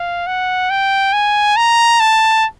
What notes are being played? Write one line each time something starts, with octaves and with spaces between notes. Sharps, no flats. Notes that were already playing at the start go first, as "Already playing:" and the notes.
Already playing: F5
F#5
G5
G#5
A#5
A5